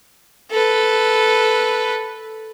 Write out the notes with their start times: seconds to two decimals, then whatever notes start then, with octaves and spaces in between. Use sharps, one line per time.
0.51 A4 B4